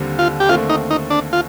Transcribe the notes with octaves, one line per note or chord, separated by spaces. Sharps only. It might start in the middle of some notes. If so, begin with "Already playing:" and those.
Already playing: D#2 D3 G3 C4
F4
G4
D#2 D3 A3 C4 F4
D#4
D#4
D4
F4